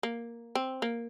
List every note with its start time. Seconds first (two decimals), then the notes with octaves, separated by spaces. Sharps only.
0.03 A#3
0.55 C4
0.82 A#3